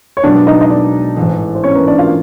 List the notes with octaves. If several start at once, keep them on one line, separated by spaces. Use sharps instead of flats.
C#5
B1 B2 G#3 D4 D5
D#4 D#5
D#5
D4 D5
A1 G#2 E3
C5
C#4 C#5
B4
A#3 A#4
D4 D5
F4 F5